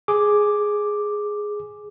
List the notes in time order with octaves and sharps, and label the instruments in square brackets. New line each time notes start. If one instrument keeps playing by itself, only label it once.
[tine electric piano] G#4 D6